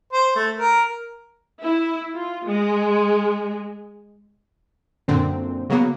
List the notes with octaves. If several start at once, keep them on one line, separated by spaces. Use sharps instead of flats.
C5
A3
A#4
E4
F4
G#3
F#2 A#2 D3 C4
C#3 F#3 A#3 B3